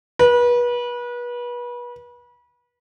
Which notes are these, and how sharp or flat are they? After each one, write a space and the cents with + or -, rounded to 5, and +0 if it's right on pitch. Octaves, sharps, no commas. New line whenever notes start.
B4 -30